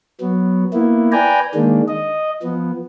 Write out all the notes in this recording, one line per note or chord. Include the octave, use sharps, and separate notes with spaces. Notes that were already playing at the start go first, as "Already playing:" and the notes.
F#3 B3
A#3 B3 E4
B4 D5 G5 G#5 A#5
D#3 G#3 A#3 D4
D#5
F3 B3